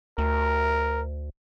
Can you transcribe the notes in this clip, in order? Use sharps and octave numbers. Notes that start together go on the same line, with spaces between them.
D2 A#4